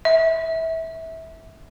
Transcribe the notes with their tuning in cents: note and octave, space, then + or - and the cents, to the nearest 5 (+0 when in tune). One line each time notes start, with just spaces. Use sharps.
E5 -20